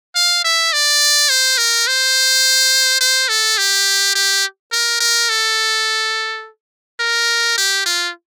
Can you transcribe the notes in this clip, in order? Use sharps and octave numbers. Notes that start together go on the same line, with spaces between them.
F5
E5
D5
C5
A#4
C5
C5
A4
G4
G4
A#4
A#4
A4
A#4
G4
F4